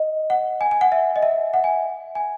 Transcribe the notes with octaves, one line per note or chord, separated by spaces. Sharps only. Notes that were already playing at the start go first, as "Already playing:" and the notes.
Already playing: D#5
F#5
G#5
G#5
F#5
E5
D#5
E5
F#5
G#5
G#5